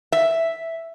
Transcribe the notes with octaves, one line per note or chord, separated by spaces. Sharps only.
E5